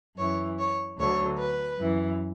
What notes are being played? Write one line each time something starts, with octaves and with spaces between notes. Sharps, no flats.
F#2 E3 C#5
C#5
D2 D3 F#3 C#5
B4
F#2 E3